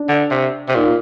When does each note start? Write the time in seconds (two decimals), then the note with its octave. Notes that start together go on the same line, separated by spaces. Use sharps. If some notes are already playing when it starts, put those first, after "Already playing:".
Already playing: D4
0.09 D3
0.31 C3
0.68 C3
0.75 A#2 D#4
0.84 F4